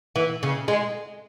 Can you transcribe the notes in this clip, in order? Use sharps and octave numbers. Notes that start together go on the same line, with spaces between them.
E3
C#3
G#3